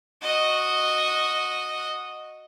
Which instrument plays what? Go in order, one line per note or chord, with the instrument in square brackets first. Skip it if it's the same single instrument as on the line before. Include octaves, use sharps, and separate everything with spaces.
[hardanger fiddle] F#4 D#5